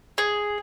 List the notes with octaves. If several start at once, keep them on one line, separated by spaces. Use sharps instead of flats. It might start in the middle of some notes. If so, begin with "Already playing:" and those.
G#4